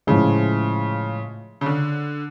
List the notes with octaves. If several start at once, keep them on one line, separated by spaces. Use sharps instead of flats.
A2 C#3 F3 G#3
C#3
D3